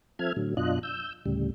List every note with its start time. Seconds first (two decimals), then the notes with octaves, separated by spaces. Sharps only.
0.19 F3 C4 A4 E5 F6 G#6
0.36 A2 D3 F#3
0.57 F#2 B2 D4 F4 D#5 F#6
0.83 E6 G6
1.26 D2 A2 C#3 G3